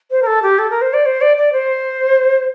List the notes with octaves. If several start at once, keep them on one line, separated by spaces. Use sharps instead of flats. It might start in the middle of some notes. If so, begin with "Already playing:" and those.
C5
A#4
A4
G4
A4
A#4
C5
D5
C5
D5
D5
C5